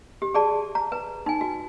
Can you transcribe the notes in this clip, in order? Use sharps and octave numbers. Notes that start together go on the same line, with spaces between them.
G4
G#4 D5 A5
A#5
B4
D#4 G#5
F#4